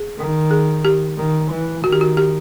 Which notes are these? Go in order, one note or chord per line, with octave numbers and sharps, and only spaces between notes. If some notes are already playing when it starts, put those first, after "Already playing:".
Already playing: G#4
D#3
G#4
G4
D#3
E3
D#3 F#4
G4
F#4
G4